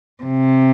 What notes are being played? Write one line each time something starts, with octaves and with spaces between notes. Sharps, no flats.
C3